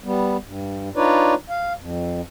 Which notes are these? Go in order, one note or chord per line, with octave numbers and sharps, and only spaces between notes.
G3 B3
G2
D4 D#4 F4 B4 C#5 D5
F5
F2